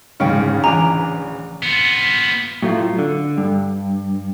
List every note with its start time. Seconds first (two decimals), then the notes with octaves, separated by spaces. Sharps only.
0.20 D1 G#2 C#3 C#4 F5 G5
0.64 E3 D4 D#4 G#5 A#5
1.63 B3 F4
2.62 A2 F#3 A3 E4 F4
2.99 D3
3.38 G2